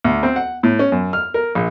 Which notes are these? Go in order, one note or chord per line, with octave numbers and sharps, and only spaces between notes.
D2
C4
F#5
A2
C#4
F#2
F6
A#4
A#1